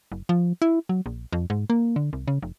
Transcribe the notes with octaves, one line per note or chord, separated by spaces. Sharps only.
F#1
F3
E4
F#3
A#1
F2
G#2
A#3
D3
C2
C#3
F1